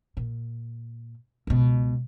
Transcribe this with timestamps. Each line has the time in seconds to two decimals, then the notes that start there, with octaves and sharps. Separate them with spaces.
0.17 A#2
1.47 C#2 B2